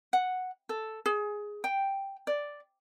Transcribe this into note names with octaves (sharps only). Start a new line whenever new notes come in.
F#5
A4
G#4
G5
D5